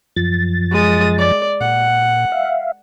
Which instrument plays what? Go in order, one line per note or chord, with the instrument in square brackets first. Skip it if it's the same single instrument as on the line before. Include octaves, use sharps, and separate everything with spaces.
[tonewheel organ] F#2 F3 A6
[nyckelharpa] G#3 D#6
D5
[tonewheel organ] A#2 [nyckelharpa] F#5
[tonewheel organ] E5 F5